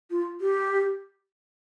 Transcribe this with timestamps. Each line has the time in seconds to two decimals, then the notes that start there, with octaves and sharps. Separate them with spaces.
0.11 F4
0.41 G4